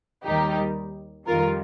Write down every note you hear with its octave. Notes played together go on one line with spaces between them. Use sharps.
D#2 D#3 G3 D#4 G4
F2 D#3 G3 F4 A#4